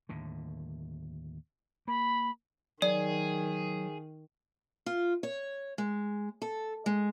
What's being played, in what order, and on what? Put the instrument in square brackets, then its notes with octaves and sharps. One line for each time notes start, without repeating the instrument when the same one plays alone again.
[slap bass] D#2 A2 D3
[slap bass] A#3 [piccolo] B5
[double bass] D#3 [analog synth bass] F#3 [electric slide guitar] G#4 [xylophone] D5
[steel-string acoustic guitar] F4
C#5
G#3
A4
G#3